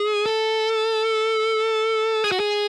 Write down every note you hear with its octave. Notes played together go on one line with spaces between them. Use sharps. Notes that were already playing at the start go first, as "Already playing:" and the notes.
Already playing: G#4
A4
G#4
F#4
G#4